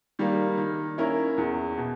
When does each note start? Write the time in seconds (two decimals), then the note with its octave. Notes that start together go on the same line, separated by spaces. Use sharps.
0.19 D#3 G3 A#3
0.58 D#3
0.98 A#3 C#4 E4 A#4
1.38 E2
1.78 B2